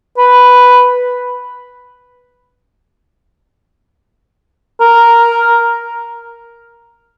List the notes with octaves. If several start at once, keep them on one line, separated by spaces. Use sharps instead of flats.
B4
A#4